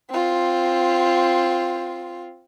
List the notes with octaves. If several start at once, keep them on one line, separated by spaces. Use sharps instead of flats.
C4 F4